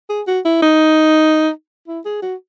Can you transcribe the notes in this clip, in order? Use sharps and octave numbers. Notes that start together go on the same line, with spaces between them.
G#4
F#4
E4
D#4
E4
G#4
F#4